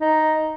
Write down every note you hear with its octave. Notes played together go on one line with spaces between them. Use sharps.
D#4